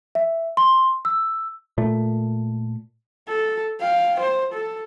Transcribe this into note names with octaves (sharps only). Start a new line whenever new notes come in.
E5
C6
E6
A#2 A3
A4
F5 G5
C5
A4